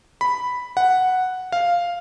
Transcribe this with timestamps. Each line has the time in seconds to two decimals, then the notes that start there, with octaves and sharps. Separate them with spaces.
0.21 B5
0.77 F#5
1.52 F5